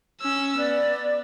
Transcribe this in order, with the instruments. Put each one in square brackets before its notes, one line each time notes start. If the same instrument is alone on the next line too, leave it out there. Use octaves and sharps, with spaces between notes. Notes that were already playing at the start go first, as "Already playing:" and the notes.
[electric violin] C#4 E6
[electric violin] B3 [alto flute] D5